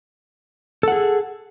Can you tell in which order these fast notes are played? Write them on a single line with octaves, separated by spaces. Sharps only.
A4 F#5 G#4